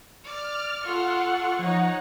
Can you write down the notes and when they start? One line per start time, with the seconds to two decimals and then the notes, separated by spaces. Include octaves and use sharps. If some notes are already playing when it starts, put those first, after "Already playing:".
0.24 D5 F6
0.84 F4 A4 F#5 C#6
1.59 F3 D#4 C#5 F#5